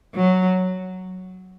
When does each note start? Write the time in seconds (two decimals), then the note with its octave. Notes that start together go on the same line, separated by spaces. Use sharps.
0.14 F#3